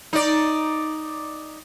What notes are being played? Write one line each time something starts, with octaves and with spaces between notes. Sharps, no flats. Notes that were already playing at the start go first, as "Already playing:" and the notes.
D#4 D5